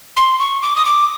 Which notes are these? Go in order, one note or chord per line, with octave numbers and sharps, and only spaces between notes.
C6
C#6
D6
D#6
D6